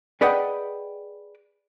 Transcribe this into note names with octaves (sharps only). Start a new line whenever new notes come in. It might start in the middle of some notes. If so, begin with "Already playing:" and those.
G#4 B4 D5 D#5 F#5 G5